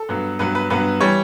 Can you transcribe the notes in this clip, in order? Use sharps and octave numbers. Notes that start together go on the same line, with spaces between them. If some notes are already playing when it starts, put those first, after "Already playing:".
Already playing: A4
G2 F#3 B3
G2 F#3 B3 B4
B4
G2 F#3 B3 B4
E3 G3 C#5